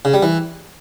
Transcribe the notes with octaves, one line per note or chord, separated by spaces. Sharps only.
C#3
G3
E3